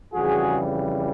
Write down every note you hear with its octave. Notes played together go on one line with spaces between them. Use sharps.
F2 C#3 E3 G3 F#4 G#4